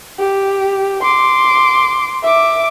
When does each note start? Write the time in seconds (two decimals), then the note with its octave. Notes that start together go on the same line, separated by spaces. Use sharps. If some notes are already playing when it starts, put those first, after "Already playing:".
0.19 G4
1.03 C6 D6
2.23 E5 D6